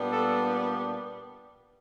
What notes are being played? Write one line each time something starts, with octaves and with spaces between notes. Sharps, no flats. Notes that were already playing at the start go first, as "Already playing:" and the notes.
Already playing: A#2 G3 B3 D4
A4